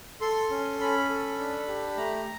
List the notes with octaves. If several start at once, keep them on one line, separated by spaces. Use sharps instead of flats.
A4 C6
C#4
C#4 B5
A4
D4
G4
A3 A#5